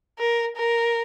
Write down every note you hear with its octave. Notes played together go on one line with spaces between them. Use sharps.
A#4
A#4